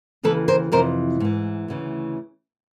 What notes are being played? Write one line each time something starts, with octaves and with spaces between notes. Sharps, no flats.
D#2 C#3 E3 A4 B4
A#4 C5
F2 C3 E3 A#4 C5
G#2 E3
D2 C#3 E3